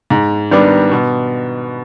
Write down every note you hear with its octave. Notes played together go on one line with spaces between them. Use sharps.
G#2
D#3 G3 B3 D4
B2